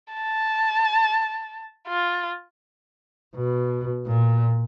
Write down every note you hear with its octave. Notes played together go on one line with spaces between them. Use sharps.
A5
F4
B2
A#2